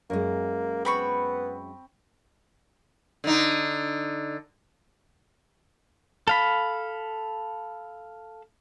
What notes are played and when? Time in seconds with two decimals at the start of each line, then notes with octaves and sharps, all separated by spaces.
0.10 F#2 G#3 A#3
0.85 B3 C4 B5 C#6
3.24 D3 D#4
6.28 A4 F5 B5